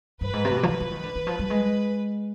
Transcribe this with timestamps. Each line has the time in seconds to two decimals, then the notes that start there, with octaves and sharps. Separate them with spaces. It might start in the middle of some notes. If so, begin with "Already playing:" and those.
0.21 G2 B4
0.33 G#2
0.45 C3
0.51 B2
0.57 C3
0.63 F3
0.69 D#3 B4
0.80 F3
0.91 D#3
1.04 D3
1.15 D#3
1.27 F3
1.39 G3
1.50 G#3